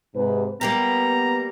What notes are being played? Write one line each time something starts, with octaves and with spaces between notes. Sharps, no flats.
G#2 C3 B4
G3 A#3 B3 G4 A#5